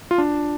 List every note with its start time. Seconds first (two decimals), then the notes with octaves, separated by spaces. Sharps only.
0.11 F4
0.18 D4